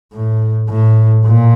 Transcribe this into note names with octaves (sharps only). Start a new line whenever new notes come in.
A2
A2
A#2